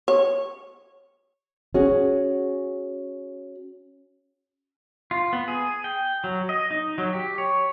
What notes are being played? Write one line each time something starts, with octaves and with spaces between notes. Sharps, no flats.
C#5
C#4 F#4 G#4
F4
B3
G#4
G5
F#3
D#5
D#4
F#3
G4
C#5